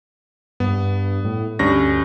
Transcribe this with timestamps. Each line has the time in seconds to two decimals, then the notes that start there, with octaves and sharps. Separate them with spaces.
0.60 G2 B3
1.24 A2
1.59 D2 G2 C#4 A#6